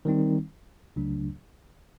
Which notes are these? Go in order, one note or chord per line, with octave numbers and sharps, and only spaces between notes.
D#3 G3 C4 D#4
C#2 C#3 F#3 A3 D4